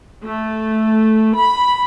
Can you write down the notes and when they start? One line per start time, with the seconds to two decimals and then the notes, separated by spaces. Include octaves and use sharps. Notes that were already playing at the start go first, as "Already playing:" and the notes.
0.22 A3
1.35 B5